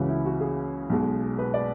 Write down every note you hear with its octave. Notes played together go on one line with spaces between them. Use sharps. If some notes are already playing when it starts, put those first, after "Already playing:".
Already playing: C#2 C#3 E3 F#4
E4
F#4
G#4
B1 B2 G#3
B4
D5